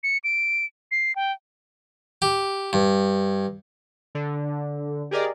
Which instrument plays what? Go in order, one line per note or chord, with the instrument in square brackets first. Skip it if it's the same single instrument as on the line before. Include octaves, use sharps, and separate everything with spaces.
[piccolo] C#7
D7
C7
G5
[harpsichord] G4
G2
[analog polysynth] D3
G4 G#4 A#4 D5 D#5